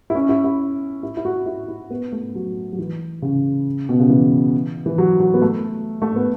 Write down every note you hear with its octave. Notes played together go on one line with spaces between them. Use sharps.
E4
C#4
E4
E4
E4
E4
F#4
E4
E4
B3
A3
F#3
F#3
E3
C#3
B2
C#3
E3
E3
F#3
F#3
B3
A3
A3
B3